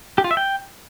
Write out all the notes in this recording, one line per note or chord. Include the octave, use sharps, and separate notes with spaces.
G4
F4
E5
G5